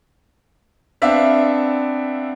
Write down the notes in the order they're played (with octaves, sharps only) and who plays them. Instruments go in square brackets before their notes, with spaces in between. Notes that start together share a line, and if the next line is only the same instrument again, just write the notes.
[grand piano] B3 C4 D4 E5 F5